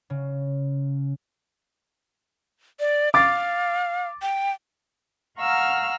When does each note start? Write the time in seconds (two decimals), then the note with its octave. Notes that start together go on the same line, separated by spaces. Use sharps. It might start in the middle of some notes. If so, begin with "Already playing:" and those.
0.10 C#3
2.80 D5
3.14 F5 D6 A6
4.22 G5
5.38 F5 F#5 A#5 C#6 E6 F6